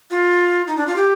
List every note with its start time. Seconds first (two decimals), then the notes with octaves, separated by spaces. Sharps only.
0.11 F4
0.67 D#4
0.77 D4
0.87 F4
0.96 G4